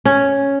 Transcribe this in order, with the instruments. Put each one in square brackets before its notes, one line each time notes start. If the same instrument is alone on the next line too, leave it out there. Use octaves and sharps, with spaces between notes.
[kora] C#4